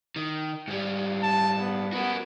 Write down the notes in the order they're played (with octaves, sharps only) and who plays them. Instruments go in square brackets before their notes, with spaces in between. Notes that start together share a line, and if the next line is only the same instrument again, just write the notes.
[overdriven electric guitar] D#3
G#2 G3
[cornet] A5
B3
[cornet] B3 [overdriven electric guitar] F#4 A#4